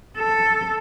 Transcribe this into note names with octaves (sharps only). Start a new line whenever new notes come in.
A4